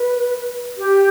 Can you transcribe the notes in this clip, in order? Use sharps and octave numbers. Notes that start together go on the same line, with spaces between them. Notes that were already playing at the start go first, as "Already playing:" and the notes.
Already playing: B4
G4